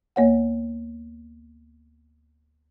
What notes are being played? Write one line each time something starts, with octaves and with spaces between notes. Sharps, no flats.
D2 A#3 C#5 F#5